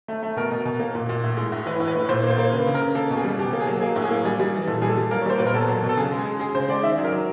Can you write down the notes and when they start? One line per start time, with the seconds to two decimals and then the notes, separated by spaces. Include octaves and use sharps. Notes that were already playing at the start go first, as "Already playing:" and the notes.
0.08 A3
0.23 A3
0.36 B2 A#4
0.51 B2
0.65 B2
0.80 A#3
0.95 A#2
1.09 A#2
1.24 A2
1.37 G#3
1.52 A2
1.66 E3 B4
1.80 A2
1.87 B4
1.95 A2
2.09 A#2 C5
2.23 A#3
2.30 C5
2.38 A#3
2.52 C#3 B4
2.67 C#3
2.74 A#4
2.81 C#3
2.95 A#3 A4
3.10 B2
3.17 G#4
3.24 G3
3.39 B2 G4
3.53 A#3
3.61 G#4
3.67 F#3
3.81 A#3 G#4
3.96 A2
4.04 G#4
4.11 A#3
4.25 G3 G#4
4.40 G3
4.54 E3
4.67 A#2 A4
4.82 G3 G#4
4.89 A4
4.97 G3
5.11 A#3 A#4
5.21 C#5
5.26 G3 C5
5.38 A#2 B4
5.46 A#4
5.54 B2 A4
5.68 F#3
5.83 B2
5.89 A4
5.97 C#3 G#4
6.12 G#3
6.18 G#4
6.26 G#3
6.40 G#3 G#4
6.55 C#3 C5
6.68 G#3 D5
6.83 D#3 E5
6.98 F#3
7.04 A#4
7.12 F#3